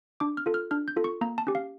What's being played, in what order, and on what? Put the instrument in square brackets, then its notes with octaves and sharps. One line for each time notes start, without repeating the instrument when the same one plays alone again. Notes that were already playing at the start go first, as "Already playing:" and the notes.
[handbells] D4 D6
F6
F4 A4
F6
D4 F6
G6
F4 A4
C#6
A#3 A#5
A5
C#4 G4
F5